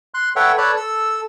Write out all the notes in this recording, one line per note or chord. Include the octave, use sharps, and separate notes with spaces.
C6 F#6
A4 B4 C#5 E5 F#5 G5
A4 B4 C#5 D5 A5 B5
A4 E6